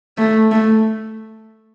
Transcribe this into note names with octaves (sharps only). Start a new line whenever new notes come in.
A3
A3